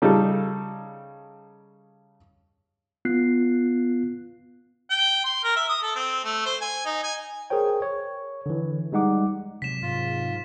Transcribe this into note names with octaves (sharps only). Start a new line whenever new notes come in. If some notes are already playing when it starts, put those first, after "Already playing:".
C#3 G3 D#4 A4
B3 F4 F#6 C7
G5
C6
A#4
E5
D#6
A4
C4
A3
C5
G#5
D#4
G#5
G#4 A#4 C5 C#5 G5
C#5
D3 E3
G3 G#3 D#4 F#5 D6
C3 F#3 B6 E7
G#2 F4